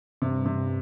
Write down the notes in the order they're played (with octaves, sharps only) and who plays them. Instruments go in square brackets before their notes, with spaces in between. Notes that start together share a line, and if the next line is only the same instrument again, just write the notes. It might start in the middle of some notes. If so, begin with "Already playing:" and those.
[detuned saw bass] G2 [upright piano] C3
[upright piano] C3